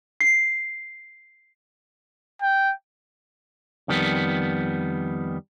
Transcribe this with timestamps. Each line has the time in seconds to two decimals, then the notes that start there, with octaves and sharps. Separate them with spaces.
0.21 C7
2.42 G5
3.88 F2 D#3 G3 B3